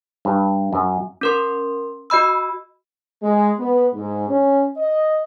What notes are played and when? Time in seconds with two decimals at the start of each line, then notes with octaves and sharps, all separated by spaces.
0.25 G2
0.73 F#2
1.21 C#4 A#4 C6
2.10 F#4 D#5 B5 E6
3.23 G#3
3.58 B3
3.94 G#2
4.28 C#4
4.77 D#5